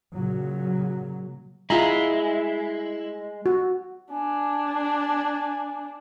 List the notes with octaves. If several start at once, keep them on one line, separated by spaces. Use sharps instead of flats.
A#2 C#3 F#3
G#3 E4 F4 A#5
F#4
D4 G#5